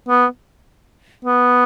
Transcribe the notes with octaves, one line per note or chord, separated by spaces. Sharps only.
B3
B3